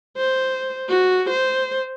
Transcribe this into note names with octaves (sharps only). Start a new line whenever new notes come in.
C5
F#4
C5